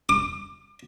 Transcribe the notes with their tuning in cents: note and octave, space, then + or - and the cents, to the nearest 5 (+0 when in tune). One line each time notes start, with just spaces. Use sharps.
D6 +40